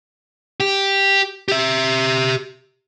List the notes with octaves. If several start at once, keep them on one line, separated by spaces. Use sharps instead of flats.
G4
G4 E5